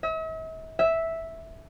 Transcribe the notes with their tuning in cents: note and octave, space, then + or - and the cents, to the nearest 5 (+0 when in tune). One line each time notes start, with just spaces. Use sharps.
E5 -45
E5 -5